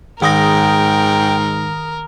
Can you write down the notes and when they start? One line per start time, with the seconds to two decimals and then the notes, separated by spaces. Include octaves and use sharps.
0.22 G#2 D#3 A#4 G5 D#6 A#6